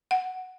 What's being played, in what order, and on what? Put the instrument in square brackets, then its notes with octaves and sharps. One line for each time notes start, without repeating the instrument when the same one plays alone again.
[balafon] F#5